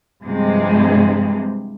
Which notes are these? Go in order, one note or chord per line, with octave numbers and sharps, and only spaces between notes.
G2 C3 F3 G#3